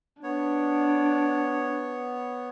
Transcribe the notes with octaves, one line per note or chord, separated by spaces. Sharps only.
B3 D4 C#5